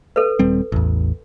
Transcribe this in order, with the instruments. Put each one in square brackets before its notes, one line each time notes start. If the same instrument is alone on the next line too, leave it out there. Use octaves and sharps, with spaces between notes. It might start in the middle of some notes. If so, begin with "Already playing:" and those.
[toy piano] A4 B4
[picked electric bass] D#1 G3 C4
A1 E2